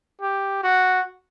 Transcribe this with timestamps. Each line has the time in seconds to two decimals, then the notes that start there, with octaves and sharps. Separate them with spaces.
0.21 G4
0.63 F#4